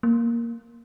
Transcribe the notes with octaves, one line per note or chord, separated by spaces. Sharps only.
A#3